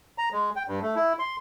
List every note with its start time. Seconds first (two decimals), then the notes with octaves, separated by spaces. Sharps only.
0.18 A#5
0.32 G#3
0.56 G5
0.68 G2
0.82 A3
0.95 E4
1.19 C6